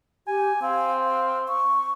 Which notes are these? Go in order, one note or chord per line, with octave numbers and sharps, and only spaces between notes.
G4 G#5
C4 F5
F5
C#6